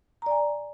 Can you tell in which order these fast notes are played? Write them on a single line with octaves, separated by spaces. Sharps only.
A#5 D5 G#5